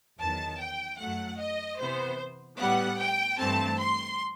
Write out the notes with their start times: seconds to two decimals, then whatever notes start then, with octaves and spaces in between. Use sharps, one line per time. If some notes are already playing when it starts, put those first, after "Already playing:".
0.20 E2 D#3 F#3 A5
0.60 G5
0.99 F#2 F#3 A3 F#5
1.40 D#5
1.79 C3 E3 B3 C5
2.58 A2 G3 B3 F#5
2.99 G5
3.38 G2 E3 A3 C4 A5
3.78 C6